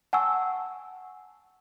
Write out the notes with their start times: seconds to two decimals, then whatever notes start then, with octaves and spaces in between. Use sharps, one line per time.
0.13 F#5 G#5 A5 C#6 E6